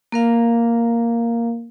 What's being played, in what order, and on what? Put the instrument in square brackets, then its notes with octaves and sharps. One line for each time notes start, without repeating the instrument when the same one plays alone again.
[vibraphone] A#3 A#4 F5